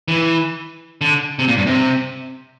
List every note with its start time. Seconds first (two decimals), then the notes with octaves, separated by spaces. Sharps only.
0.08 E3
1.01 D3
1.39 C3
1.48 A#2
1.57 G2
1.67 C3